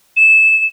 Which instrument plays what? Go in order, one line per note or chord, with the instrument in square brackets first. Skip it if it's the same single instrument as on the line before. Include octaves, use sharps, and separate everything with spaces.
[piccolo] E7